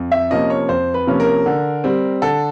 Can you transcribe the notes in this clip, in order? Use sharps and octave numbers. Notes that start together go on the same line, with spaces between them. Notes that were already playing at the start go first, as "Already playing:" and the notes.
Already playing: F2
E5
C3 F3 A#3 C#4 D#5
C#5
F2 C5
B4
C3 F3 A#3 C#4
A#4
D3
G3 C4
D3 A4